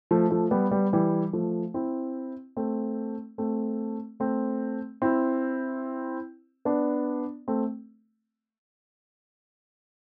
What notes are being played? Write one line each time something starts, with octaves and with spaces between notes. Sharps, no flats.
F3 A3
F3 A3
G3 B3
G3 B3
E3 G3
F3 A3
C4 E4
A3 C4
A3 C4
A3 C4
C4 E4
B3 D4
A3 C4